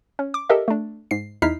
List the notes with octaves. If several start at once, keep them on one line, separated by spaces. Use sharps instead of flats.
C#4
D6
G4 A4 A#4 D#5 E5
A3 D4
G#2 C7
E2 D#4 E4 F6 B6 C7